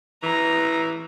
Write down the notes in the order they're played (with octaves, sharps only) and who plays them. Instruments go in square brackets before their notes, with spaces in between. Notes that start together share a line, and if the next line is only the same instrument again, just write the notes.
[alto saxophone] E3 [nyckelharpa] A#5